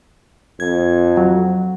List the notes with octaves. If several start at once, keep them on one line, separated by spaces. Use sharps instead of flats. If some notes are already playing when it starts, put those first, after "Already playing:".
F2 G#6
F#3